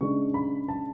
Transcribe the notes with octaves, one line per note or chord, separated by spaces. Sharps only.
C#3 G#3 D4 C#6
B5
A5